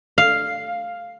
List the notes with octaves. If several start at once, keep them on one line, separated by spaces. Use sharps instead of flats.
F5